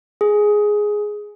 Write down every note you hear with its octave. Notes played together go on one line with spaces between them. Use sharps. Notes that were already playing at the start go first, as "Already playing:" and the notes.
G#4